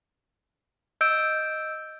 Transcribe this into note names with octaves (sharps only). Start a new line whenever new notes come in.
D#5 E6 G6 D7